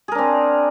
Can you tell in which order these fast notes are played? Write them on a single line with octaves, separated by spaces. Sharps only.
G#4 A#4 D4 C4